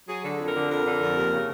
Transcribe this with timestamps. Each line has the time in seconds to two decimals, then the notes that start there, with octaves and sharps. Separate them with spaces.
0.08 F#3 G#4
0.23 D3 A4
0.40 F2
0.47 A#4
0.55 D3
0.70 F2 A#4
0.85 D3
1.01 F2
1.16 D#2
1.32 C#3